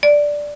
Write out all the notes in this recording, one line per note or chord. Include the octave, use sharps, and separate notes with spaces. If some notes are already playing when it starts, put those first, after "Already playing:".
D5